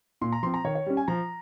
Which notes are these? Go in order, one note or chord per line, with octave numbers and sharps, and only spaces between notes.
A#2 C6
A#5
F3 C4 C6
A#5
D#3 C#5
C#5
G3 C#4
G#5
F3 A#5